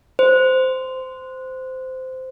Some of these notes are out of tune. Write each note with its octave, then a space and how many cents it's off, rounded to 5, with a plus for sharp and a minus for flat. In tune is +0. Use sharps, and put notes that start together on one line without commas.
C5 -15